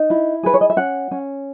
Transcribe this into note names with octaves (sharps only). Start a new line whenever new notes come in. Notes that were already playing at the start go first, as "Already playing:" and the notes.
Already playing: D#4
E4
G#4 B4
C#5
D#5
E5
C#4 F#5
C#4